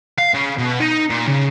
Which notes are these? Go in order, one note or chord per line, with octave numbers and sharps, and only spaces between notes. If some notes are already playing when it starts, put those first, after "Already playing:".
F5
C#3
B2
D#4
A#2
C#3